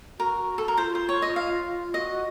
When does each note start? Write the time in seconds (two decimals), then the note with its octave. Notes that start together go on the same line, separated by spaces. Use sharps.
0.19 F#4 A#4
0.58 A4
0.68 A#4
0.77 F4 C5
0.95 C5
1.09 C#5
1.22 D#5
1.36 F5
1.94 F#4 D#5